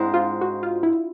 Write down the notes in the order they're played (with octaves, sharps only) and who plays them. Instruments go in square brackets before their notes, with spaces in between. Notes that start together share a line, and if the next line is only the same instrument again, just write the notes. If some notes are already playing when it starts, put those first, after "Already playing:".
Already playing: [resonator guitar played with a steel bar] G#2 G#3 C4 [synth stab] D4 E4
[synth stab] F4
F#4
F4
E4